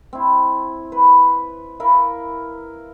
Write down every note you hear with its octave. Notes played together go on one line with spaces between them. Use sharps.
C4 E4
B4
E4 A#4 F5